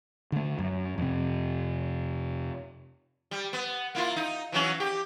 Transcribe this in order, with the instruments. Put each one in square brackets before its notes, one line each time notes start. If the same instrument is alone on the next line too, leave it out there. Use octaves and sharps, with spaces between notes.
[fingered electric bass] D3 A3
F#2
F2 C3
[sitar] G3
B3
A#3 E4 F4
D#4
E3 F#3 C#4
G4